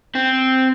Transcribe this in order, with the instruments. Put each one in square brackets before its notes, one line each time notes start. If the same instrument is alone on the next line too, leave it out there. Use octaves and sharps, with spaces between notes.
[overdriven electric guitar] C4